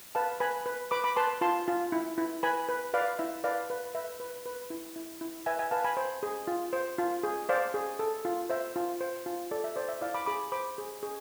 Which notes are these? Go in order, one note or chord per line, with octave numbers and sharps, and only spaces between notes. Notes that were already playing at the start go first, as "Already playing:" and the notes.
B4 F5 A5
B4 G#5 B5
B4
B4 B5 D6
B5 D6
B4 A5 C6
F4 A5 C6
F4
E4
E4
B4 G#5 B5
B4
B4 D5 F5
E4 E5
B4 D5 F5
B4
B4 E5
B4
B4
E4
E4
E4
B4 E5 G#5
E5 G#5
B4 F5 A5
G#5 B5
C5
G#4
F4
C5
F4
G#4
C5 D5 F5
G#4
A4
F4
C5 E5
F4
C5
F4
A4 D5
E5
C5 D5
E5
E4 D5 F5
B5 D6
G#4 B5 D6
C5 B5 D6
G#4
G#4